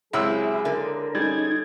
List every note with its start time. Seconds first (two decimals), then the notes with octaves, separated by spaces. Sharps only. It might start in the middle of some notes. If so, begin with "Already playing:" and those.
0.13 C#2 C3 F#3 E4 G#4 E6
0.65 D3 A#4
1.15 G3 C#4 D#4 G#4 G#6